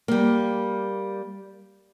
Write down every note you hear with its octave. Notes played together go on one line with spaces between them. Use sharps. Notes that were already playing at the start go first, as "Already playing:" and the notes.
G3 A#3